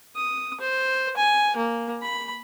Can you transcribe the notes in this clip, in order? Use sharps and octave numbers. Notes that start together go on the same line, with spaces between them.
D#6
C5
G#5
A#3
B5